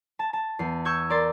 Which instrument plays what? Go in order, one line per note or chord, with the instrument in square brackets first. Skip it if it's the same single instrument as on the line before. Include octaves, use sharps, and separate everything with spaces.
[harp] A5
A5
E2 C7
C#6 E6 G6 G#6
A#4 D5 C6 A6